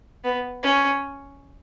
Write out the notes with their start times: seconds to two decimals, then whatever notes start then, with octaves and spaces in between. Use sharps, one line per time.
0.24 B3
0.63 C#4